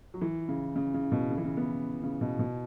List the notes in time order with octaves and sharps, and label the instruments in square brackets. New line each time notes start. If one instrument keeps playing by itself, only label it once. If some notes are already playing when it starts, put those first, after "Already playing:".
[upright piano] F#3
E3
C#3
C#3
C#3
B2
C#3
E3
C#3
B3
C#3
B2
B2